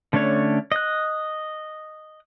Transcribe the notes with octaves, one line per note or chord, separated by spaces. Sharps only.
D3 A3 C#4 D4 C#5
D#5 F#6